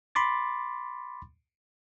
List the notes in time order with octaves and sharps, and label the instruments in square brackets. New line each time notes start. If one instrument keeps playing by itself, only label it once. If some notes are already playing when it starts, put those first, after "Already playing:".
[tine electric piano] B5 C6 D6 A6